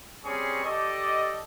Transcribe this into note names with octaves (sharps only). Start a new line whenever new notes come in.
G3 C4 C#4 G#4 C#6
G4 A4 D5 D#5